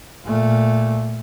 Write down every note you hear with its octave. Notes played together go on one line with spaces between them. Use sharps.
A#2 A3